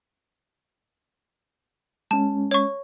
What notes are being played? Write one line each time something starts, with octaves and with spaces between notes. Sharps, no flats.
G#3 C#4 A5
C#5 C#6